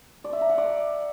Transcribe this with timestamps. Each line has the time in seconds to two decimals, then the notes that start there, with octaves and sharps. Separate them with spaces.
0.24 D5
0.33 E5
0.41 A#5
0.50 F#5
0.58 D5